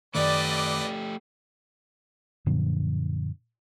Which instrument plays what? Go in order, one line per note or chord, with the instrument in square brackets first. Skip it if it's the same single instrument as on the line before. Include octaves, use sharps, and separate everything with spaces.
[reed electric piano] F#2 D#3 [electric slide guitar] A3 G4 [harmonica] B4 D#5 D6 [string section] D5
[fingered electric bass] F#2 A#2 D3 F3